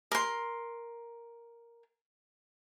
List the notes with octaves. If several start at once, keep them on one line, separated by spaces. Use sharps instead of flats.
A#4 C6